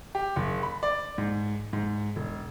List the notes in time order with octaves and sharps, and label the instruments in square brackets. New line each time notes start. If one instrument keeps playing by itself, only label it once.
[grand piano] G4
F#1
B5
D5
G#2
G#2
E1